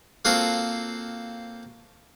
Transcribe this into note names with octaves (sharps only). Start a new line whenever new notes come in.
A#3 C4 F4 F#4 A4 C5